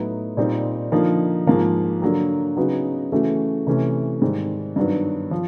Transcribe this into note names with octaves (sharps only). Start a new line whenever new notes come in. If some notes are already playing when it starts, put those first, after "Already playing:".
Already playing: A2 F#3 B3 D#4
A#2 G3 C4 D#4
D3 F3 A#3 D#4
G#2 F3 A#3
D3 F#3 A#3
C#3 F#3 B3 D#4 F#4
C#3 E3 A3 C#4 F#4
C3 E3 A3 C#4
G#2 D#3 G3 C4
G2 D#3 F#3 B3
F3